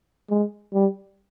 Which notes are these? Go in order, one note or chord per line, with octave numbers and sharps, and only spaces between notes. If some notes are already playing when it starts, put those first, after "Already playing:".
G#3
G3